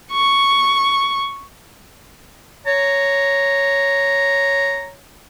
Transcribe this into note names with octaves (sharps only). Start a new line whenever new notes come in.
C#6
C#5 A#5